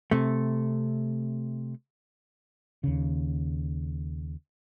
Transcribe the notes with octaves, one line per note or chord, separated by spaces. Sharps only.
C3 A3
D#2 C#3